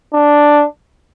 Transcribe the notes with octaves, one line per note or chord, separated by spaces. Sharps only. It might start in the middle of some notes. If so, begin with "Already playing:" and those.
D4